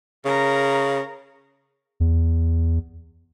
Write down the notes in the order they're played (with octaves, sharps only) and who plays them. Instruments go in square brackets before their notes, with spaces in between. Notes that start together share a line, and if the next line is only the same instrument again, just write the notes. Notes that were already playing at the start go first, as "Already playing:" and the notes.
[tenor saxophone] C#3 [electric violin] A#4 A#5
[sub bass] E2